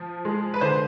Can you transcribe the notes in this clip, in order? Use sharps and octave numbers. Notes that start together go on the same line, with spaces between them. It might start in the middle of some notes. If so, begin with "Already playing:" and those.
Already playing: F3
G#3
B4
D3 C5